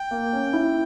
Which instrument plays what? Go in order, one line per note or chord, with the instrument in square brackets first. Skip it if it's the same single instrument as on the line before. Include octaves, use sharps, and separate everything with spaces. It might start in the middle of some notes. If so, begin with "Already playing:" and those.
Already playing: [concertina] G5
[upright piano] A#3
C#4
E4